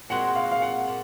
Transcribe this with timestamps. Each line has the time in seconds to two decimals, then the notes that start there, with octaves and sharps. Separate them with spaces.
0.09 A#2 G#3 C4 F#4 A#4 F#5
0.35 F5
0.51 F5
0.62 F#5
0.87 A#2